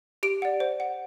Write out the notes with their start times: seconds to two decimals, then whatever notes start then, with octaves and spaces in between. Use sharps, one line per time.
0.23 G4 D7
0.42 D5 F#5
0.60 C5
0.80 F#5